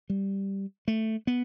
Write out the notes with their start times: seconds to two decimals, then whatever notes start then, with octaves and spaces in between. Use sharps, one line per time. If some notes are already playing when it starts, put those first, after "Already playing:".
0.10 G3
0.88 A3
1.27 B3